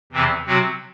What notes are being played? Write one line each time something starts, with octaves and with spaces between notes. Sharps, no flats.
E2 C3 E3 C4
C3 F#3 C4 F#4